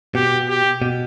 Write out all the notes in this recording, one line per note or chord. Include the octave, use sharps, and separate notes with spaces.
B2 G4
G4
B2